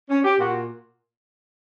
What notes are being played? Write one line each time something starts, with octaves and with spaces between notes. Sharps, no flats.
C#4
G4
A#2 F#4